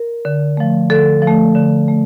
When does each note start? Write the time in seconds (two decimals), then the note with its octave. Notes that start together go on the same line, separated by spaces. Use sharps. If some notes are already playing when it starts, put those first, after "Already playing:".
Already playing: A#4
0.25 D3
0.57 F3 A3
0.90 D3 A4
1.22 F3 A3
1.55 D3
1.88 A3